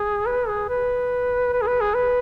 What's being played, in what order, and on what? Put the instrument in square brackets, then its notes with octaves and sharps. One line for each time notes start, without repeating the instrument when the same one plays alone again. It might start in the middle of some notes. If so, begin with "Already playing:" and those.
Already playing: [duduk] G#4
B4
G#4
B4
B4
G#4
B4
G#4
B4